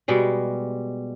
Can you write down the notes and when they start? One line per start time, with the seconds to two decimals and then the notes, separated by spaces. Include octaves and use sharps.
0.08 B2 G3 G#3